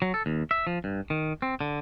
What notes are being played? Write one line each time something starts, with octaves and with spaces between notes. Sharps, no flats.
F#3
A4
D#2
E5
F3
G2
D#3
C4
D3